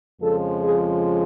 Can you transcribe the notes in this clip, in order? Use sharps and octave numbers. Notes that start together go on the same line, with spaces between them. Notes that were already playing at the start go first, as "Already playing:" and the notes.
F2 C#3 F3 G#3 A4
G#4